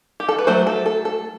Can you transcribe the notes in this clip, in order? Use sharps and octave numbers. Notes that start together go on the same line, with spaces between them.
G4
A4
B4
F#3 A3 C5
A4
A4
A4